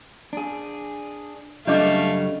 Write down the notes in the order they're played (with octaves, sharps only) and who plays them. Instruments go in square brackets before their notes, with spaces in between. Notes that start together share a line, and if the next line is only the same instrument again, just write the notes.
[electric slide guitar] D4 G#4
[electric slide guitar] F#2 C#3 G3 [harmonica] A3 F5 [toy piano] D4 D#5 D6